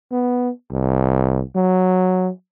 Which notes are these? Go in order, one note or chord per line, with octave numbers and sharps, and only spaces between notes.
B3
C2
F#3